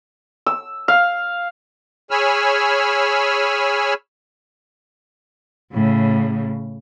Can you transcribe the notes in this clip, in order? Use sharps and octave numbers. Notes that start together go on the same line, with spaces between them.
E6
F5
G#4 C#5 G#5 B5 E6 F6
A2 C#3